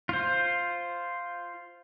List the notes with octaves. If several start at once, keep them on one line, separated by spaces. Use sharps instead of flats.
F4 C5